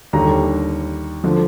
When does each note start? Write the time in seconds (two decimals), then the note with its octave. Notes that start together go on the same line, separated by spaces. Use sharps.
0.13 D#2 D3 G3 A#5
1.24 D3 F3